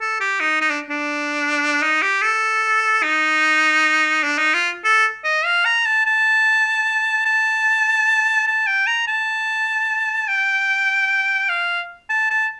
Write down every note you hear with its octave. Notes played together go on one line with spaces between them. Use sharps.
A4
G4
D#4
D#4
D4
D4
D#4
G4
A4
D#4
D4
D#4
F4
A4
D#5
F5
A#5
A5
A5
A5
A5
G5
A#5
A5
G5
F5
A5
A5